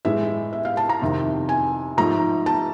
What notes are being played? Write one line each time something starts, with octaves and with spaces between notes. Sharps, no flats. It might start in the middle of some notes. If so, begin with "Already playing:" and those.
A2 E3 G#3 E5
E5
F5
A5
A#5
F2 C3 D#3
G#5
G#2 F3 A3 A#5
A5